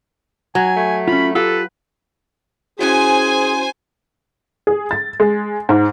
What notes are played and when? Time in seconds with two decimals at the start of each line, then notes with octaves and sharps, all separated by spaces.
0.55 F#3 G#5
0.76 A3
1.08 C#4 F4 B5
1.35 F4 G4 A4 B4 F5
2.79 C#4 E4 F#4 G#4 C5 G#5
4.67 G#4
4.91 A6
5.20 G#3
5.69 G#2